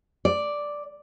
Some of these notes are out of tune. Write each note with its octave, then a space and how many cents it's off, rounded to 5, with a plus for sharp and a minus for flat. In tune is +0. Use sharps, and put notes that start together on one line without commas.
D5 +0